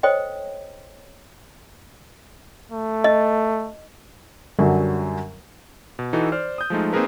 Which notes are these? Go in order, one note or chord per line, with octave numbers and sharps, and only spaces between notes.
A4 C5 C#5 D#5 G5
A3
D#5
F#2 D3 F#3 G3
B2
E3 D#4 F#4 A4
C5 D5 F6
D#6 G6
F3 G#3 A3 D#4
A#3 C4 D#4 G#4 A#4 B4